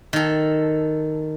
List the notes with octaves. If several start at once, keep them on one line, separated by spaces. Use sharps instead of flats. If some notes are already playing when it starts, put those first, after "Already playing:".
D#3 A4